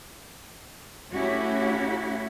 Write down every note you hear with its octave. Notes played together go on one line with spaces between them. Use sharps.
A3 C#4 E4 F#4 G4